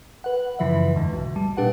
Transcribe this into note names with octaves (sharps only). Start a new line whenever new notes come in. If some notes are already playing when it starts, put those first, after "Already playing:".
B4 F#5
F#2 C#3 E3 F3 B4 E5
E2 G#2 D3
B1 G#2
G3 A5
A#2 D4 G4 B4 F#5